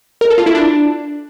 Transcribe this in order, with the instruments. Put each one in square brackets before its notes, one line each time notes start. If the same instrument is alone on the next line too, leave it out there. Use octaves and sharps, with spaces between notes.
[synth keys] A#4
A4
F4
E4
D4